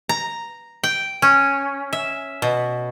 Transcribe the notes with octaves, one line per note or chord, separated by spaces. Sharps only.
A#5
G5
C#4
E5
B2